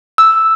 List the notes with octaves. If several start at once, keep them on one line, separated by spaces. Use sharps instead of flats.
E6